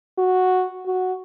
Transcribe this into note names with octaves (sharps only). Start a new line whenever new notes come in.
F#4
F#4